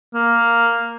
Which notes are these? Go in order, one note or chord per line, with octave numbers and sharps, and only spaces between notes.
A#3